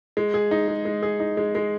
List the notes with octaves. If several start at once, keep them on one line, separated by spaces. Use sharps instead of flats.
G#3
G#4
D#4
G#3
G#3
G#4
D#4
G#3
G#3